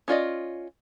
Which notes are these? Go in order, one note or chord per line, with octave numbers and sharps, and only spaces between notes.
C#4 F4 D5 D#5